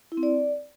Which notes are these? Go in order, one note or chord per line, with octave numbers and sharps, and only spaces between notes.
E4
C4
D5